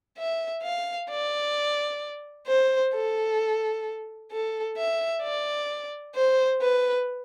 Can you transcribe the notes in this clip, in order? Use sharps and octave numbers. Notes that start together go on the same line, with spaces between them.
E5
F5
D5
C5
A4
A4
E5
D5
C5
B4